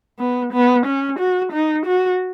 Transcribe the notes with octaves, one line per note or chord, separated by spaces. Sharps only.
B3
B3
C#4
F#4
D#4
F#4